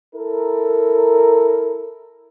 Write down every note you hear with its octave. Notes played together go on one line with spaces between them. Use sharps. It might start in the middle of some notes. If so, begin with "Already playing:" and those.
E4 A4 A#4